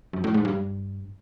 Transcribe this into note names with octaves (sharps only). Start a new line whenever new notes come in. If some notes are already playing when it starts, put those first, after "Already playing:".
F#2
A2
G#2
G2